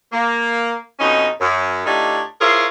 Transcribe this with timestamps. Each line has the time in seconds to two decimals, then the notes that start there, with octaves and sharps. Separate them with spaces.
0.12 A#3
1.00 F2 B2 C#4 D#4
1.41 F#2
1.86 A2 D4 D#4 F4 G4 C#5
2.41 E4 F4 G#4 A#4 C5 C#5